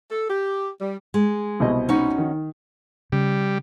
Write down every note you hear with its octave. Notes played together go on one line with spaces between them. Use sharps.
A4
G4
G3
G#3
C2 B2 D#5
C#4 D#4 F#4
D#3
C#3 G3